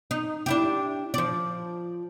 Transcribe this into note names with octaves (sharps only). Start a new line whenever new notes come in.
D#4
D4 E4 G4
F3 D5